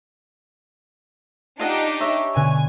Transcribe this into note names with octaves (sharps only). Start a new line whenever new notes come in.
D4 D#4 F4 G4 D#5 F#5
C#5 E5 F#6 A#6
B2 D3 G#5 F#6